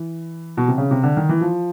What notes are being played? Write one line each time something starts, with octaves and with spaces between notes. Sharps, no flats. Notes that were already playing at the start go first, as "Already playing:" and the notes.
Already playing: E3
B2
C3
C#3
C3
D3
D#3
E3
F3